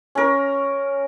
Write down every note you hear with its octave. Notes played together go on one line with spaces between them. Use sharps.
C#4 A#4